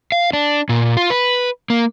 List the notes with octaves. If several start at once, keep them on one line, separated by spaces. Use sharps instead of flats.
F5
D4
A#2
F4
B4
A#3